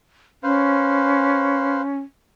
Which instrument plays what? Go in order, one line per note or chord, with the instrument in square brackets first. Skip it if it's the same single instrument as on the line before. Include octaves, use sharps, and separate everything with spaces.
[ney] C#4 [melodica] B4 C5 F5